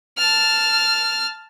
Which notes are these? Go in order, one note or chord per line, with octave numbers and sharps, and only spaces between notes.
A5 F6